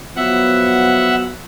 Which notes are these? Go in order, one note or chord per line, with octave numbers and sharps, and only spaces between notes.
F3 F#3 B3 E5 F#5